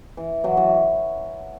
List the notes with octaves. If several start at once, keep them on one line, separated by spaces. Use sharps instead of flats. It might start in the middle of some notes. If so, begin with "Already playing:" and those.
E3
E3 F#3
E3 F#3